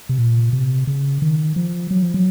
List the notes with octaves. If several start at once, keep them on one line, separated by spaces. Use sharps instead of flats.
C3
A#2
C3
C#3
D#3
F3
F#3
F3
F#3